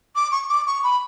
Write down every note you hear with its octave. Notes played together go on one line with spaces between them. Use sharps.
D6
C#6
D6
C#6
B5